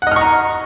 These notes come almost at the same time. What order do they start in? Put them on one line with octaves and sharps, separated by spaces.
F#5 D#5 F6 C#6 A#5